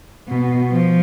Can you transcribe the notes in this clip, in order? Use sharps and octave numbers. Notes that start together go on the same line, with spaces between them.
B2
F3